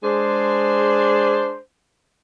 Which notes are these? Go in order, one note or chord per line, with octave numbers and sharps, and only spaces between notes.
G#3 D4 G#4 C5